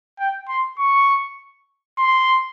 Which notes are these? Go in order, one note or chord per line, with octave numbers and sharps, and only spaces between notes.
G5
C6
C#6
C6